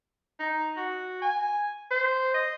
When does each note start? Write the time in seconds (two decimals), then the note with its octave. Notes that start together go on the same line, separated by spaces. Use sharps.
0.40 D#4
0.77 F#4
1.22 G#5
1.91 C5
2.34 D#5